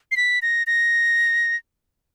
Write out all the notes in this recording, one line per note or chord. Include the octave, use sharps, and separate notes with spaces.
C7
B6
A#6
A#6